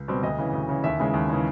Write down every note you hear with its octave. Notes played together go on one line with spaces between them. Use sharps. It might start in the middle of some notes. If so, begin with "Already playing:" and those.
Already playing: C#2
B2 G3 C4
D2 D#5
C#3 E3
D2
C#3 E3
D#2 E5
C#3 E3 G#3
D#2
C#3 E3 G#3